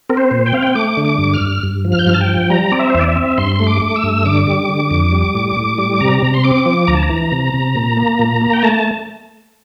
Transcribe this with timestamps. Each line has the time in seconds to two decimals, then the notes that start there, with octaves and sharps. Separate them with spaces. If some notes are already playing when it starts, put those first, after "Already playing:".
0.10 C4 A#4
0.17 C5
0.31 A#2
0.46 G5
0.53 C4 F5
0.62 G5
0.75 A3 D6
0.97 D3
1.05 D6
1.18 G2
1.34 F6
1.41 G2
1.63 G2
1.85 F3
1.92 F6
1.99 G6
2.06 G2 F6
2.14 A5
2.21 G5
2.29 F3
2.50 G3 A#5
2.72 C4 D5
2.79 E5
2.90 C5
2.95 E2 D5
3.08 E5
3.16 C4
3.38 G2 C6
3.56 A3 C6
3.67 D6
3.82 A3
3.96 E6
4.03 G2
4.25 D3 D6
4.47 G3
4.69 D3
4.91 F2
5.12 G3
5.35 A2
5.57 A2
5.78 G3
6.01 C3 A#5
6.22 C3 A#5
6.34 C6
6.44 C4 D6
6.66 F3
6.87 D2 A#5
6.95 A5
7.03 A#5
7.09 E3
7.32 C3
7.54 C3
7.75 A#2
7.97 A#3
8.19 A#2
8.41 A#3
8.53 G5
8.63 A3 A5